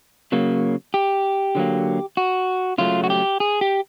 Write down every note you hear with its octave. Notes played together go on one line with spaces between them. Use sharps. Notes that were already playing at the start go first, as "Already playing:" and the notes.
C#3 F#3 A#3
G4
D3 F#3 A#3
F#4
C#3 F#3 A3 F4
F#4
G4
G#4
G4